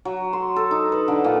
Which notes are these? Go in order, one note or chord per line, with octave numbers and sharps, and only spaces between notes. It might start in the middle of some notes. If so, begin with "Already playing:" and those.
F#3
C6
A4
D#4
B4
D3
A#2